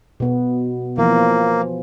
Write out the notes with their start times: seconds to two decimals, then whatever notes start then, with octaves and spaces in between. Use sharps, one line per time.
0.20 B2 B3
0.98 E3 F3 A#3